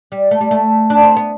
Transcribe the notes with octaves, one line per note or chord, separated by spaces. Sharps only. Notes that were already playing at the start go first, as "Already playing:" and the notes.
G3
A3
G3
A3
D4
C4
B3